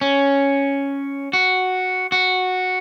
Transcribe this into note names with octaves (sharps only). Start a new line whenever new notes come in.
C#4
F#4
F#4